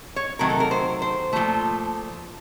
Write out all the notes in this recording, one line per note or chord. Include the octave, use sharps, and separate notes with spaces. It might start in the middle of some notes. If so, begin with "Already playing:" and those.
C#5
C3 D#3 F#3 A3 A#4
A4
A#4
C5
C5
A#2 F3 A3